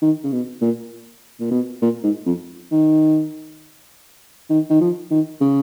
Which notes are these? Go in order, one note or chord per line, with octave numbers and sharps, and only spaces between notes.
D#3
C#3
B2
A#2
A#2
B2
A#2
G#2
F2
D#3
D#3
D#3
F3
D#3
C#3